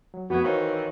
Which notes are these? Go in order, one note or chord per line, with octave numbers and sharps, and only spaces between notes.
F#3
F2 A3 B3 F#4 G#6
D#3 E3 C4 C#5 F5